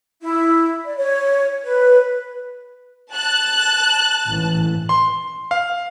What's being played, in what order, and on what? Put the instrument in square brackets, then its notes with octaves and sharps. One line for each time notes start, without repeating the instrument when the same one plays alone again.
[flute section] E4
D5
C#5
B4
[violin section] A5 F#6
[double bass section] A1 G#2 E3
[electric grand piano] C6
F5